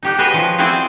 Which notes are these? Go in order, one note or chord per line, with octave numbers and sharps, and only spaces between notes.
D#4 G4 F#5
F#4 G#4 B4 C#5 D#5
F3
C4 E4 F#4 G#4 D5 G5